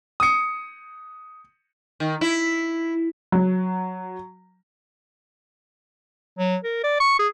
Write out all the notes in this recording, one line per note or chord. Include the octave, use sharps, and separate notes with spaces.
D#6 C#7
D#3
E4
F#3
F#3
A#4
D5
C#6
G#4